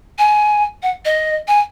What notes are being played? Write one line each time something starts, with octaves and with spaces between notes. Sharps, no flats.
G#5
F#5
D#5
G#5